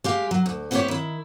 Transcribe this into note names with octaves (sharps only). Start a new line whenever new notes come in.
G#3 G4 F5
F#3
D2
B3 C4 E4 F#4 G4 C#5
D#3 E4